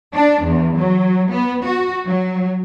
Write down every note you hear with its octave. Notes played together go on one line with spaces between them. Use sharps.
D4
E2
F#3
B3
F#4
F#3